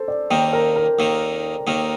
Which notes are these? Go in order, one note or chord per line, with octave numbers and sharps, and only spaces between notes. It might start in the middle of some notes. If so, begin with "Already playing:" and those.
Already playing: A4 C5
D5
D#2 D#3 A#3 G5
A#4
A#4
D#2 D#3 A#3
D#2 D#3 A#3